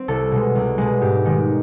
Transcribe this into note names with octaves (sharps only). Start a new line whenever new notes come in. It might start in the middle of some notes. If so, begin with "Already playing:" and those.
Already playing: C4
C2 A4
B2 G#3
C2
B2 G#3
G#2 G4
D#3 G#3